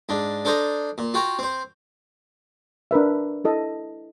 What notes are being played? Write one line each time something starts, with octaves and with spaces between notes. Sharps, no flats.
G#2 D4
D4 A4 C5 D#5 A#5
A#2
F4 F#4 G5 A#5
C4 C5
D4 A#4 B4 E5
E4 A4 D#5